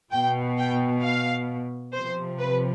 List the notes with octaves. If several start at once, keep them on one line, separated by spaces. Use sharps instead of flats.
B2 G5
G5
F5
C3 F3 C5
B4